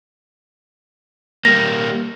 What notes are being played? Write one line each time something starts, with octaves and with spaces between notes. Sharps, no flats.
G3 A#3 A#6